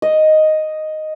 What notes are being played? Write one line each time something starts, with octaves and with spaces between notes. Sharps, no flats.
D#5